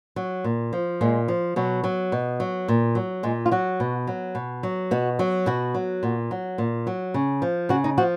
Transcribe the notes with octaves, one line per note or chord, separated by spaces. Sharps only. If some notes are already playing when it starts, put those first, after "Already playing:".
F#3
A#2
F3
A#2 G#3
F3
B2 F#3
F#3
B2
F#3
A#2
F#3
A#2 G#3
F4
F#3 F#4
B2
F#3
B2
F#3
B2 F#4
F#3
B2 F#4
F#3
A#2
F#3
A#2
F#3
C#3
F3
C#3 F#4
D#4
F3 F#4